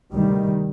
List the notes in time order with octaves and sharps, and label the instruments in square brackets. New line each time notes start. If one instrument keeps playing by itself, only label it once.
[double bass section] D2 C3 D#3 G3